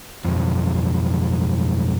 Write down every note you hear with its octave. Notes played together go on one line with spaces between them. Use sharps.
B1 F2